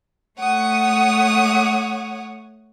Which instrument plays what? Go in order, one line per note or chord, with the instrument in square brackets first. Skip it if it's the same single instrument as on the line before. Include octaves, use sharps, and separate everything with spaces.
[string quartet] A3 C#5 F#5 D#6